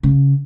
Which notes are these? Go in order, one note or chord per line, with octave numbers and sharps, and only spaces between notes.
C#3